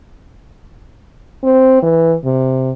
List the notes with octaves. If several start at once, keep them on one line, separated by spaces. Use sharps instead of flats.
C4
E3
C3